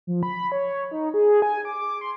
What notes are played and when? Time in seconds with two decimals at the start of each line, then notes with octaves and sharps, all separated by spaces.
0.07 F3
0.23 B5
0.52 C#5
0.91 D#4
1.14 G#4
1.42 G#5
1.65 D6
2.01 C6